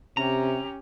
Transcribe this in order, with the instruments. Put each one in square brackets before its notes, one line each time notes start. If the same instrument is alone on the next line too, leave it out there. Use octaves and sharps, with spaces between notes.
[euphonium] C3 [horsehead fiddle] C#4 G4 [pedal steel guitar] A#5